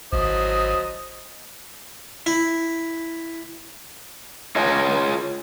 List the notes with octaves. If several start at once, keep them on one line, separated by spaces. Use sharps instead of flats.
G#1 F#3 C5 D#5 D#6
E4
F4 G#4 C#5 D#5